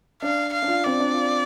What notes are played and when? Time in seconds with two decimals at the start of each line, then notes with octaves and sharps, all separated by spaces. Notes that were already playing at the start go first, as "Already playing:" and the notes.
0.22 D4 F5
0.53 F5
0.63 D4
0.68 F4
0.83 C4 D5
1.00 D4
1.14 F4